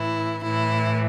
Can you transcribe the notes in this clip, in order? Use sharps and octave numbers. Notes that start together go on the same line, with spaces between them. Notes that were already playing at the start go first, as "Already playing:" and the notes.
Already playing: A2 E3 E4
A2 E3 E4